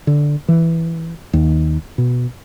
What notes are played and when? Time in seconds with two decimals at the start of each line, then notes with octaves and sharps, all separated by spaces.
0.07 D3
0.48 E3
1.33 D#2
1.98 B2